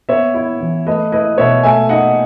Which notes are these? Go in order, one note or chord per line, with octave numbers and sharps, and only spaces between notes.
B3 C#5 E5
E4
E3
A3 B4 D#5
E4 B4 D#5
B2 C#5 E5
A3 E5 G#5
D#4 D#5 F#5